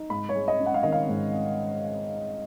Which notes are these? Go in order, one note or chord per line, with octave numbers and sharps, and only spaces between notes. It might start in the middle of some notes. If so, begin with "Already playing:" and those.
Already playing: D#4
G#2 B5
C#5
G#3
D#5
C#4
F#5
F5
D#3 D#5
F5
G#2